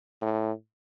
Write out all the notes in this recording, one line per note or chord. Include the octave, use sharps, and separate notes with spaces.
A2